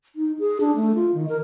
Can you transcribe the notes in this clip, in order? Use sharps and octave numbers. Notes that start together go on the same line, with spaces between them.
D#4
G#4
D4
A3
F4
D#3
A#4